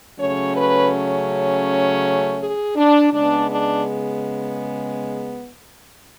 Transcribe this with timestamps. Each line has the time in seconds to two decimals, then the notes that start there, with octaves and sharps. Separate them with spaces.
0.18 C#3 F#3 A3 C#4 C#5
0.55 B4
2.39 G#4
2.76 D4
3.12 C#3 G#3 B3 D4
3.49 D4